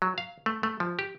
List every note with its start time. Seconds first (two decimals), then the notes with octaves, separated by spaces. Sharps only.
0.02 F#3
0.18 F5
0.46 A3
0.63 A3
0.80 F3
0.99 G4